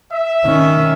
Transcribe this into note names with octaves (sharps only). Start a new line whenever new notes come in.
E5
D#3 C#4